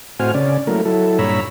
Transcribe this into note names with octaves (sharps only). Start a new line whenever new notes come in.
A2 C4 F#4 C5 G#5 F6
C#3 C#4 D5
F#3 A3 A#3 E4 A#4
F#3 E4 A4
G2 A#2 C#5 A#5 B5 E6